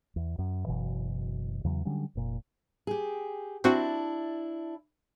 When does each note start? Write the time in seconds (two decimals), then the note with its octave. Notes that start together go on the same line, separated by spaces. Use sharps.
0.16 E2
0.39 F#2
0.66 F#1 B2 E3
1.64 E2 C#3 F#3
1.85 D3 F#3 G3 C#4
2.15 F1 A#2
2.87 G4 G#4
3.64 C4 D4 E4 F#4